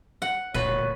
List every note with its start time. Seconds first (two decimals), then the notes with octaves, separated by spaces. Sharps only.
0.22 F#5
0.54 E1 D2 A#2 B4 C#5